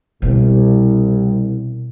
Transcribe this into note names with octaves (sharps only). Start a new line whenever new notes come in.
C2 B2